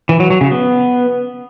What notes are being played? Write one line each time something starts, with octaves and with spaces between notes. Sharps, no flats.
E3
F#3
F#3
C#3
B3